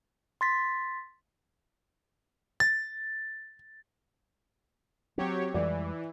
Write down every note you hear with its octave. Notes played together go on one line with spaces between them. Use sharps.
C6 A6 B6
A6
F#3 C4 C#4 G4 C#5
F2 E3 G3 G#3 D5